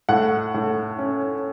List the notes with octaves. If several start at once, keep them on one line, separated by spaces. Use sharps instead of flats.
A2 F#5
A2
C#4